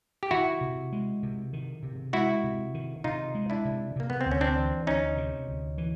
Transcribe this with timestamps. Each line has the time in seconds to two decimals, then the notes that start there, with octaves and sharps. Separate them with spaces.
0.23 G4
0.31 D#3 E4 F#4
0.61 C3
0.92 G#3
1.23 C3
1.53 D#3
1.83 C3
2.13 G#3 E4 F#4
2.44 C3
2.74 D#3
3.04 C3 D#4 F4
3.35 G#3
3.50 D4 E4
3.65 C3
3.96 C3 A#3
4.10 B3
4.21 C4
4.26 D2
4.31 C#4
4.41 C4 D4
4.57 E3
4.86 D2 C#4 D#4
5.17 C3
5.47 D2
5.78 E3